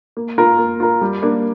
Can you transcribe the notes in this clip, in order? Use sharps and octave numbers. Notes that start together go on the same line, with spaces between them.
A#3
F4 A#4
A#3
F4 A#4
G3
A#3 D4